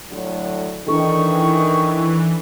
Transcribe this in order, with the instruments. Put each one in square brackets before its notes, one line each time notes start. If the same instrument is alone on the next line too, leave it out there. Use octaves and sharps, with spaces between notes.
[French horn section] A2 D3 F#3
[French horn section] D#3 [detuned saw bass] E3 [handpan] D4 A4 [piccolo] C#6